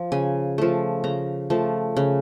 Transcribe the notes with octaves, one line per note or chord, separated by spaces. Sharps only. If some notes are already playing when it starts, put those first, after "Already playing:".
Already playing: F3
C#3 G#5
F3 A3
C#3 A#5
F3 A3
C#3